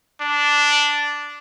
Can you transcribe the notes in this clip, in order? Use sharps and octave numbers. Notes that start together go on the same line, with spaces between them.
D4